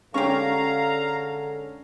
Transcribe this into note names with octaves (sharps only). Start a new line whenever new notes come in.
D3 G#3 C#4 G4 F5 A#5 C#6